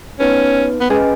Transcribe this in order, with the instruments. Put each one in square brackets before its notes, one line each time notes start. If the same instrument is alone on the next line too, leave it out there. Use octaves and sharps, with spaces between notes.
[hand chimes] B3 D#4 B4 [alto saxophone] C#4
[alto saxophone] B3
[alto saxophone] G#3 [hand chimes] C#4 G#4 B4 D#5 G#5